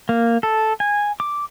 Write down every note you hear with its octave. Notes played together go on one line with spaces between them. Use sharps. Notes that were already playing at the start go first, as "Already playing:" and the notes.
A#3
A4
G#5
D6